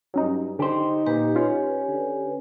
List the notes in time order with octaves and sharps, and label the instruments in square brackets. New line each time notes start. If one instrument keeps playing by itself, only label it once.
[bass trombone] G2 [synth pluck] F#3 C#4 D#4
[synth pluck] D3 [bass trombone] D#4 [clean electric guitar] G4 C5
[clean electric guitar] A#2 [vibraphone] G4 B4
[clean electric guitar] C#4 [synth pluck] F4
[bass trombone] D3